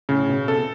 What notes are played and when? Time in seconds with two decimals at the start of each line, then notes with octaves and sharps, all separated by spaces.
0.09 A2 C#3
0.29 B2
0.48 C3 A4
0.57 B2